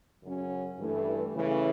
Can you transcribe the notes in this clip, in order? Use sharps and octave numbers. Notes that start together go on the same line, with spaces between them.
F#2 C#3 F#3 C#4
G2 E3 A3
C#3 E3 A3